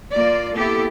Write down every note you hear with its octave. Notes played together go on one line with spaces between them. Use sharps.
A#3 F4 D5
A#3 B3 E4 G4 A4